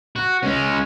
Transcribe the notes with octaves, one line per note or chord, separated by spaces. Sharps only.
F#4
G#3 C#4